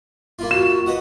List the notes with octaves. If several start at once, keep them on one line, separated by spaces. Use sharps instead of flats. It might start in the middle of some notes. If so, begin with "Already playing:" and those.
A#3 E4 F4
F#4 E7
B4 D#5 F#5